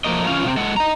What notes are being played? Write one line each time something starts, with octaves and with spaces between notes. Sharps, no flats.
F3 A3 A#3 D#5
E3 C#4 F4 F5
C3 F3 C4
G#3 A4 F#5
D#5 A#5